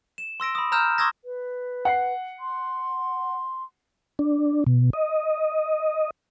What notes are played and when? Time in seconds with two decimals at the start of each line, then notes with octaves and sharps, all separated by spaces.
0.18 E7
0.40 C6 E6 A#6 D7
0.55 B5 D#6
0.72 A#5 E6 F6 G6 E7
0.98 C6 C#6 D#6 E6 G#6 A#6
1.25 B4
1.85 F#5 C7
2.40 C6
4.19 D4
4.67 B2
4.93 D#5